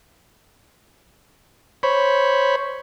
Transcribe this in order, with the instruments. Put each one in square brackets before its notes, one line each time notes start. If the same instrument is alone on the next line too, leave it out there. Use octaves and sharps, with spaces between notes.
[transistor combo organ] C5 C#5 B5